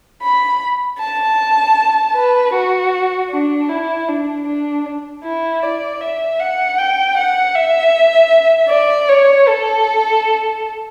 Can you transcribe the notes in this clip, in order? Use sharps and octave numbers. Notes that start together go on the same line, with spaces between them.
B5
A5
B4
F#4
D4
E4
D4
D4
E4
D5
E5
F#5
G5
F#5
E5
D5
C#5
A4